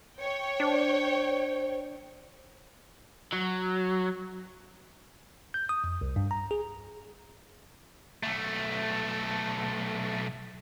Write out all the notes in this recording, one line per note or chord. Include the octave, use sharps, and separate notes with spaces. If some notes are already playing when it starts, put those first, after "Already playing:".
C#5 G5
D4 C5
F#3
G6
D#6
F2
C2
G2
A#5
G#4
B1 A3